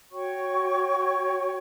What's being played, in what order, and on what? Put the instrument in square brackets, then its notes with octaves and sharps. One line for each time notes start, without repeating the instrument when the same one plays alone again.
[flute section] F#4 C#5 G5 C#6